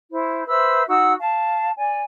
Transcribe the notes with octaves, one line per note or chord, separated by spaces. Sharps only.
E4 C5
B4 C5 E5 E6
D#4 F#4 F#5 E6
F5 A5
D5 G#5